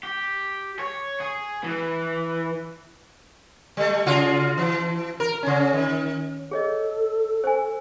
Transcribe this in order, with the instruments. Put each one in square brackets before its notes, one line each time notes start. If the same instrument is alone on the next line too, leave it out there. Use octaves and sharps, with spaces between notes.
[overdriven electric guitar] G4
C#5
G#4
E3
[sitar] G3 A3
C#3 F4 F#4
E3
A#4
C#3 C#4
D#3
[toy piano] G#4 C#5 D#5 [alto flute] A4
[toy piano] C5 G#5